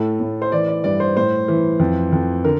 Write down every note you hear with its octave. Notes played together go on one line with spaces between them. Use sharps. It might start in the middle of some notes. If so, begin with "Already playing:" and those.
Already playing: A2 A4
A2
C5
E3 D5
D5
G2 D5
C5
A2 C5
E3
F2
F2
D3 A#4